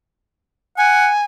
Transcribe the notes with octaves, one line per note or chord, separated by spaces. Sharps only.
F#5 G#5